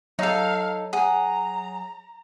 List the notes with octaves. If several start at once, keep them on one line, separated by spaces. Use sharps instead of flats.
F#3 D#4 A4 F5
G#4 F#5 A#5